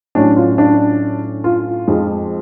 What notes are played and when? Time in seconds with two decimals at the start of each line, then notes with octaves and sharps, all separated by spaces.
0.15 A2 F#3 C#4 D4
0.37 F4
0.58 D4
1.44 F4
1.88 F2 F3 G#3